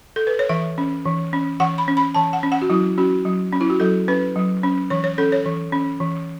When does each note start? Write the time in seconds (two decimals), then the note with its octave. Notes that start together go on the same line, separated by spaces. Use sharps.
0.16 A4
0.27 B4
0.39 C#5
0.49 E3 E5
0.78 C#4
1.05 E3
1.33 C#4
1.60 E3 F#5
1.78 B5
1.88 C#4
1.97 B5
2.15 E3 A5
2.33 F#5
2.43 C#4
2.52 F#5
2.62 F#4
2.70 F#3 E4
2.98 C#4 F#4
3.25 F#3
3.53 C#4
3.61 E4
3.70 F#4
3.80 F#3 A4
4.08 C#4 B4
4.36 F#3
4.63 C#4
4.90 E3 C#5
5.04 C#5
5.18 C#4 A4
5.32 C#5
5.46 E3
5.72 C#4
6.01 E3